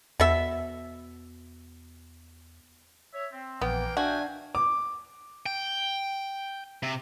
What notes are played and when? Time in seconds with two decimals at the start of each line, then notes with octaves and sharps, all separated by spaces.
0.20 E2 B2 E5
3.14 C#5 E5
3.32 C4
3.61 A#1 E3 A#3 B3 G5
3.97 D4 F#4 E5 F5 G5 G#5
4.55 D6
5.46 G5
6.83 C3